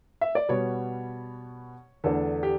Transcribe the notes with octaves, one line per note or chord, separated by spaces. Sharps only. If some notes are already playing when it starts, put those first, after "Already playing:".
E5
D5
B2 G3 B3 C#5
E2 D3 A3 D4 A4
G4